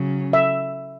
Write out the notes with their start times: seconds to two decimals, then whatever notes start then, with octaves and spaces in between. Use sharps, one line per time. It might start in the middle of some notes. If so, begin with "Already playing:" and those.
Already playing: C#3 F#3 C#4
0.33 E5